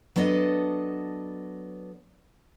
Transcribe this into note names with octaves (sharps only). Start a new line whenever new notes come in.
F#3 B3 D4 A4 D#5